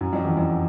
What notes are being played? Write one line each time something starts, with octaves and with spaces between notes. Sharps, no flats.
F#2
F2
E2
F2